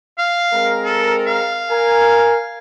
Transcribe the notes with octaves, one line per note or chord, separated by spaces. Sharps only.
F5
G#3 C4 A#4
A4
F5
A#4 G#5